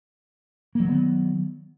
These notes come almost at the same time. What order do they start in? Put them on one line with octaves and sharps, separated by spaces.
A#3 F#3 D#3 B3